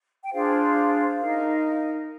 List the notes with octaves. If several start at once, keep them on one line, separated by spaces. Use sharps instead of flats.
G5
D4 F4 G#4 C5 F5
D#4 A#4